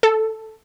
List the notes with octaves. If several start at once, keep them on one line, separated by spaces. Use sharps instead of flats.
A4